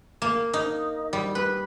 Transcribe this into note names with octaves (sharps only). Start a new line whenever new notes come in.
A#3
D#4
G3
B4